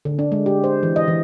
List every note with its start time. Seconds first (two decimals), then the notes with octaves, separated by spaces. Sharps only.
0.05 D3
0.19 D4
0.32 G#3
0.46 G4
0.64 C5
0.83 E3
0.96 D#5
1.08 E3